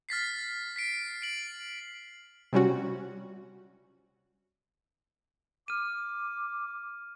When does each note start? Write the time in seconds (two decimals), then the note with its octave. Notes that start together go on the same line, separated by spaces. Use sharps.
0.09 F6 A6 B6 C7
0.76 B6 C7 D7
1.22 D7 F#7
2.53 C3 G3 C#4 F#4
5.68 D6 F6 D#7